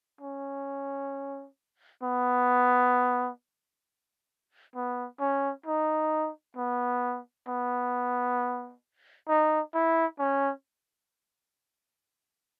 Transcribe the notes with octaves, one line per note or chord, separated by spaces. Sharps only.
C#4
B3
B3
C#4
D#4
B3
B3
D#4
E4
C#4